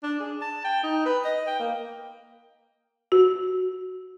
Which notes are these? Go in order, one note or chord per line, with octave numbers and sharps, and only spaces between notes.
D4
G#4
A5
G5
D#4
B4
D#5
G5
A#3
F#4